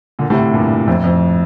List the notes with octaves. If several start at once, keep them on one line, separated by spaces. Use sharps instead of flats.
A#2 D3
A2 C3
G2 A#2
F2 A2
F2